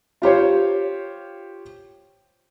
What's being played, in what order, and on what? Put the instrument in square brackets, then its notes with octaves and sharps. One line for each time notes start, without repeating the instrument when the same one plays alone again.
[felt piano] F4 G4 C5 C#5